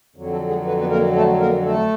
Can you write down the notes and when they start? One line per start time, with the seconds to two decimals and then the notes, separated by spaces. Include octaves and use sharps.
0.16 F2 D3 F#3
0.32 A3 A4
0.49 G#3 G#4
0.66 B4
0.80 B3 B4
0.91 A#3 A#4
1.16 A3 A4
1.40 A#3 A#4
1.65 A3 A4